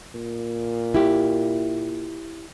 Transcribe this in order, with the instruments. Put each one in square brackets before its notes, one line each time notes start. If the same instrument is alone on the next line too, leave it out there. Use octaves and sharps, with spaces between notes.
[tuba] A#2
[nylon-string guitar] E4 G4